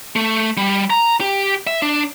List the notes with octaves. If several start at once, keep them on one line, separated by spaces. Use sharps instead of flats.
A3
G3
A#5
G4
E5
D4